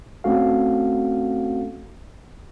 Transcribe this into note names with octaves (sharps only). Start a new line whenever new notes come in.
A3 C4 C#4 F#4 A4 F5